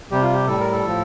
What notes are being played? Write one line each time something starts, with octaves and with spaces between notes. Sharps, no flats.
C3 G3 G4
F4
G4
A2 G3 A4
A#4
A4
A2 F3